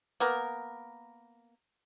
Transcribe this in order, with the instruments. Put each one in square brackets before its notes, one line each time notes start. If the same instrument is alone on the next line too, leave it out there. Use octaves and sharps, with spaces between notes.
[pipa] A#3 B3 A#4